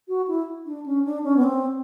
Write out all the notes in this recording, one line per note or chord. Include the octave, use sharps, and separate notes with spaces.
F#4
E4
D4
C#4
D4
C#4
B3
C4